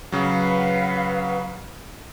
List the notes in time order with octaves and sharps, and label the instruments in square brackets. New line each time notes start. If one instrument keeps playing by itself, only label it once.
[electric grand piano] C#3 F#3 [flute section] B4 F5 F#5